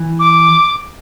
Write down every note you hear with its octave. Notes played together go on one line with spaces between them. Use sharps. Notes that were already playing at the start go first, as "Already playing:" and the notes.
Already playing: E3
D6